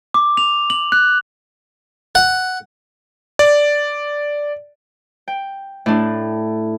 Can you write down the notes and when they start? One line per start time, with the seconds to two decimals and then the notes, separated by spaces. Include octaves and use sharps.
0.14 D6
0.37 F7
0.70 F#7
0.92 F#6
2.15 F#5
3.39 D5
5.28 G5
5.86 A2 D4